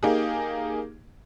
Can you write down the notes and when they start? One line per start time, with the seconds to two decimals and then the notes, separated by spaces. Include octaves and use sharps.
0.03 A#3 D#4 G4 G#4